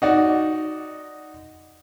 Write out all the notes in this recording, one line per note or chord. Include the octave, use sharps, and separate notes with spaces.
D#4 F#4 D5